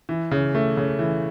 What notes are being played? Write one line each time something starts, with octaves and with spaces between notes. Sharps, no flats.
E3
C#3
A3
C#3
E3